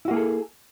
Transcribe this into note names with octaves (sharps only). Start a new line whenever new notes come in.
A#3 E4 F#4 G#4 A4